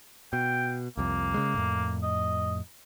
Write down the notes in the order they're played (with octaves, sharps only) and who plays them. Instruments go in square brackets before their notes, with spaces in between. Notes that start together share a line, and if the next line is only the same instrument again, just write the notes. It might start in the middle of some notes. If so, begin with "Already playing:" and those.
[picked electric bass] B2 [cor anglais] G5
[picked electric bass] C2 F2 [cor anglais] A#3
[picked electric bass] C#3 G#3
F2 A2
[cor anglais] D#5